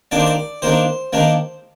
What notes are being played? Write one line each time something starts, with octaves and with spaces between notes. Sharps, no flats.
D#3 A#3 D4 D5
C5
D5
D#3 A#3 D4 C5
D#3 A#3 D4